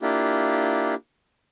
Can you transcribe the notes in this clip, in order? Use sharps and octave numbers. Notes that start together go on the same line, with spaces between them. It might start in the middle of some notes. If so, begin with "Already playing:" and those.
A#3 D4 E4 F4 G4